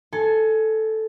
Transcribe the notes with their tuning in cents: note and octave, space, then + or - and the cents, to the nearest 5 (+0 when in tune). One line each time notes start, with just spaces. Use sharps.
A4 +0 G#5 +15